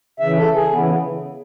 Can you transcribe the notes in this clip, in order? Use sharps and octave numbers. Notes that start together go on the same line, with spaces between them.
C#3 E3 E5
A4
G#4
C#3 E3 B3
B3